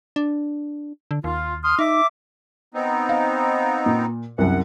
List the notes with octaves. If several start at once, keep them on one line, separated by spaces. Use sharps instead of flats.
D4
D3
D#2 F4
C6 D#6 F6
D#4 E5 D6
B3 C4 D#4
F5
A#2
C2 F#2 F#5